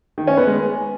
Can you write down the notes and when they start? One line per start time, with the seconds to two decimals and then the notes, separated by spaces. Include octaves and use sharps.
0.18 D#3
0.27 C#4
0.37 B3
0.47 G#3